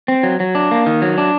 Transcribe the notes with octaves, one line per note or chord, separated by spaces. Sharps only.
C4
F#3
F#3
D4
A#3
D#3
F#3
D4